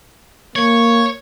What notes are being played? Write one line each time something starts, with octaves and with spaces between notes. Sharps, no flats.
A#3 C#5